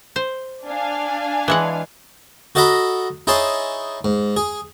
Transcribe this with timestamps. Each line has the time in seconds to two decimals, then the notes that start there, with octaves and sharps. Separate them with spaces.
0.16 C5
0.66 D4 F5 G#5
1.48 E3 G#3 F#5
2.55 F#4 A4 D#5 F#5 A#5 B5
3.27 D#4 E4 G#4 C#5 A5 C6
4.05 G#2
4.37 G#4